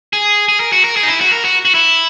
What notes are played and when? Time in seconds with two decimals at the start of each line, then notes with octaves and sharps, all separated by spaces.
0.13 G#4
0.49 G#4
0.60 A#4
0.73 F#4
0.85 A#4
0.97 G#4
1.03 D#4
1.08 E4
1.21 F#4
1.33 A#4
1.45 F#4
1.65 F#4
1.75 E4